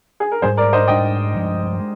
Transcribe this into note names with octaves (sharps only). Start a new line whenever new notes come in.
G#4
A#4
G#2 G3 D4 G#4 C5
A#4 D5
C5 D#5
G#2 G3 D4 D#5 G5
G2 F3 G#3
G#3